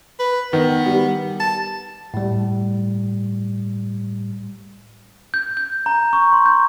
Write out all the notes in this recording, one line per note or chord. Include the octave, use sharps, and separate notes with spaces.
B4
D#3 B3
G3
A5
A2 G3
G6
G6
A#5
C#6
C6
G6